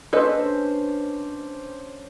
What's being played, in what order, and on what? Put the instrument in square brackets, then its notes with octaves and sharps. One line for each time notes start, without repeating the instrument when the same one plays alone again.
[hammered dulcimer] C#4 D4 C5 [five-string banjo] A4 B4 D#5